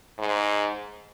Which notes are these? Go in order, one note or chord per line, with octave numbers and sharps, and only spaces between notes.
G#2